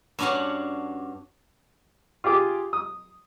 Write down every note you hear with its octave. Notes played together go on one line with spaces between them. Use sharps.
G2 C#4 D4 F#4 F5 F#5
F4 G4 G#4 D6
D#6